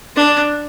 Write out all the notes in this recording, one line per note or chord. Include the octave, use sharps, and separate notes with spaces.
D4